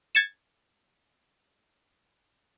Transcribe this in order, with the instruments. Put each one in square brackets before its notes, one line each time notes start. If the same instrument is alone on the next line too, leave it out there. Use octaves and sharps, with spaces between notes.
[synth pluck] G#6 A6 C#7 E7